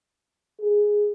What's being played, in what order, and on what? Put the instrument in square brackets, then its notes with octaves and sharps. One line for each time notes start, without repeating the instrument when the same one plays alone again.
[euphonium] G#4